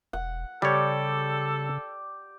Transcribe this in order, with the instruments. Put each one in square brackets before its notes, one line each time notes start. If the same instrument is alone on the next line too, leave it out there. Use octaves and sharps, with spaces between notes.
[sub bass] E1 [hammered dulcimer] F#5
[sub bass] C#3 [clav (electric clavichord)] G3 C#5 [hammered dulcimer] G4 D5 [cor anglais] A4